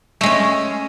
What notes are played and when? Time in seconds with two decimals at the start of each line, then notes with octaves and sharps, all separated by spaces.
0.21 A3
0.23 G#3
0.26 C#4